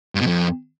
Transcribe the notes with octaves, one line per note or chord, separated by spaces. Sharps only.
G2
B2
F2